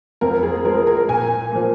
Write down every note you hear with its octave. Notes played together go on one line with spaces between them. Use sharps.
F2 A#4
G#4
F3 G#3 A#4
A#4
A#2 G#5
F3 A#3